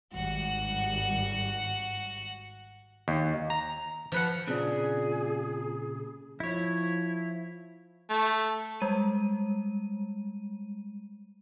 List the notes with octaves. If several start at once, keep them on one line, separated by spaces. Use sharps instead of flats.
G#1 G3 F#4 F#5
D#2
A#5
F3 B4 F#5
A#2 C#3 C4 D4 F4 G#4
F3 E4 C#5
A3
G3 G#3 D#7